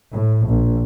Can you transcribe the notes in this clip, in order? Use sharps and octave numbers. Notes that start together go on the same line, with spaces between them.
A2
A#1